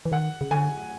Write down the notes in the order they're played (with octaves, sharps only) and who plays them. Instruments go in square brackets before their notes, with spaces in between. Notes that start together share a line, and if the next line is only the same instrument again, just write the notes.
[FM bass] E3
[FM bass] D#3 [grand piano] F#5
[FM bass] C#3
[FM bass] D3 [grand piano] G#5